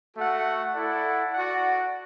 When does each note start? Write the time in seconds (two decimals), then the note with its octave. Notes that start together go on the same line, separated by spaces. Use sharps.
0.15 A3 F#4 A4 F#5
0.74 E4 A4 D5 F#5
1.33 F#4 D5 F#5